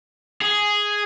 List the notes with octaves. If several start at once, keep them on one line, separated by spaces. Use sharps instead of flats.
G#4